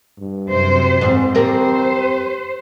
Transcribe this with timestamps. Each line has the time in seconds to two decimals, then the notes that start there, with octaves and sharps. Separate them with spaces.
0.19 G2
0.49 F#2 C3 C5
1.01 G#2 E3 C4
1.35 G3 G4 A#4 C5